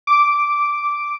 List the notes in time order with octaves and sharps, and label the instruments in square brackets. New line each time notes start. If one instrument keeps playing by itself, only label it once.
[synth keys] D6